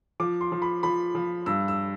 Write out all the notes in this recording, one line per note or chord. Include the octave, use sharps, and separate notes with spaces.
F3 D6
C6
F3
B5
F3 B5
F3
G2 E6
E6